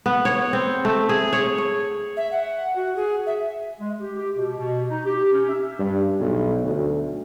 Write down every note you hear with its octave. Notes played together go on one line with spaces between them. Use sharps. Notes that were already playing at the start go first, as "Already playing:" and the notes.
B3
C#5
C4
A3
G#4
C#5
C#5
E5
F#5
F#4
G#4
E5
G#3
G4
G4
B2
B2
D#4
G4
C#4
E5
G2
B1
D2